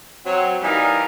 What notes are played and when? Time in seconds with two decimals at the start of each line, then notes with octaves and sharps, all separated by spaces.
0.25 F#3 C4
0.62 E3 G3 A#3 D#4 A#4 D5